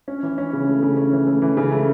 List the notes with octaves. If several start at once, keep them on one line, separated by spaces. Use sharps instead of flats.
C#4
E3
C#4
C#3
A3
C#3
C#4
E3
A3
E3
C#3
A3